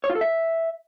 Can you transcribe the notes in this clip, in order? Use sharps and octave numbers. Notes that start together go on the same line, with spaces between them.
C#5
F4
A4
E5